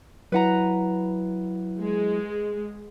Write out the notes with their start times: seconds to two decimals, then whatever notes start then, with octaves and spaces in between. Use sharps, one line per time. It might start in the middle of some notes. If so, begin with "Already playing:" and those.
0.32 F#3 E4 B4 F#5 A#5
1.82 G#3